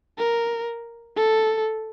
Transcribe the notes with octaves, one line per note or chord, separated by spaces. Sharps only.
A#4
A4